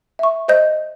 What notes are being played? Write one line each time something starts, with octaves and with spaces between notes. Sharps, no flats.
E5 C#6
C5 D#5 G6